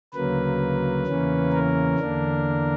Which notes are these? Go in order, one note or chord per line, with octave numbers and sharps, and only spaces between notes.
D2 C#3 F#3 A#3 B4
E2 C#3 E3 A#3 C#4
A#4
E2 D3 A#3 D4